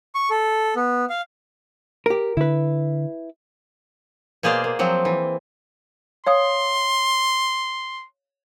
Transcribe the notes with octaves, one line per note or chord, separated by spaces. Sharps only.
C#6
A4
B3
F5
G4 A#4
D3 E4 B4
B2 A#3 G#4 C5 D5 F5
A#3
F3 F#3 C4
E3
C#5 F5 C6 D#6